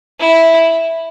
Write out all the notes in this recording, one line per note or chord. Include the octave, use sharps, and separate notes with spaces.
E4